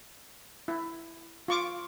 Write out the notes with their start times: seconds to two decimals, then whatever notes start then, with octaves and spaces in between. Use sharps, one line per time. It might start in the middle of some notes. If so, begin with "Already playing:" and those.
0.68 E4
1.48 F4 C#6 D6